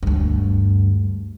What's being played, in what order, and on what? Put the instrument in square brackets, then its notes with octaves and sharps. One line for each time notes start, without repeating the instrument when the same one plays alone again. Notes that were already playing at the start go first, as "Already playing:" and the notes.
[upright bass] D2 G2